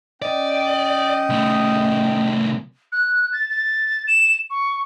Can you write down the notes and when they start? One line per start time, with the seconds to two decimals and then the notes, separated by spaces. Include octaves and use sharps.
0.22 C#4 D5 D#5 G5
1.30 C2 A3
2.92 F#6
3.32 A6
3.50 A6
4.07 E7
4.50 C#6